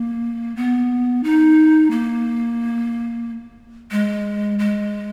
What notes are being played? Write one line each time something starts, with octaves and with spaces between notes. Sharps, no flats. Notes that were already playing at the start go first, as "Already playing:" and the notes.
Already playing: A#3
B3
D#4
A#3
G#3
G#3